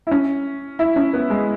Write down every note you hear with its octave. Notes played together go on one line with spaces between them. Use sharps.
E4
C#4
E4
C#4
B3
G#3